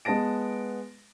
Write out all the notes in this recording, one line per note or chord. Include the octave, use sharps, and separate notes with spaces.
G#3 B3 B4 A5 A#6 D7